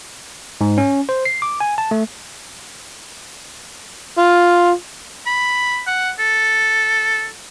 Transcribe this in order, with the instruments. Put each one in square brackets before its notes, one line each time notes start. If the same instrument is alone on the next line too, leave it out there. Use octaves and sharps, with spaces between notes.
[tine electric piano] G#2
C#4
C5
C7
D6
G#5
A5
A3
[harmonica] F4
[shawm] B5
F#5
A4